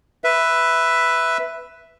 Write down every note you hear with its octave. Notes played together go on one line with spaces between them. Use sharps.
B4 E5